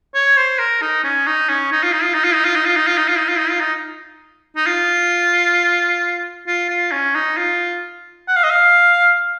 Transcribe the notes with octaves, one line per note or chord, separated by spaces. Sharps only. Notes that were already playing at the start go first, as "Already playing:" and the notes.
C#5
C5
A#4
D#4
C#4
D#4
C#4
D#4
F4
D#4
F4
D#4
F4
D#4
F4
D#4
F4
D#4
F4
D#4
F4
D#4
F4
D#4
F4
D#4
D#4
F4
F4
F4
C#4
D#4
F4
F#5
F5
D#5
F5